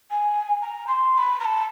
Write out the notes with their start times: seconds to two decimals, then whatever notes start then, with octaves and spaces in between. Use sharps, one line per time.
0.10 G#5
0.61 A#5
0.87 C6
1.14 C6
1.17 B5
1.39 A#5
1.44 A5